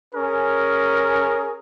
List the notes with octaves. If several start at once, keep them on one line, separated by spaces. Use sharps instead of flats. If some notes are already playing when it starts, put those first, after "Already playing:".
C#4 G#4 A#4